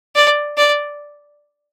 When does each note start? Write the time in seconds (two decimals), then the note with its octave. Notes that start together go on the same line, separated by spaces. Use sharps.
0.15 D5
0.57 D5